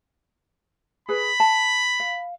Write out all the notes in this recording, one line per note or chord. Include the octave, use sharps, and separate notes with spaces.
G#4 B4 B5
A5
F5